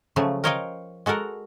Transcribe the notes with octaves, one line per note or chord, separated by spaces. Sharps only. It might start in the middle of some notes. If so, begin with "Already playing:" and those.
C#3 F3 F#3 A3
A#4 C5 C#5 D#5 F5 G5
G#3 F#4 A4 A#4 F#5